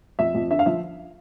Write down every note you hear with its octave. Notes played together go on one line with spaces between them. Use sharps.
F2 E5
F2
D3 E5
F5
F3 E5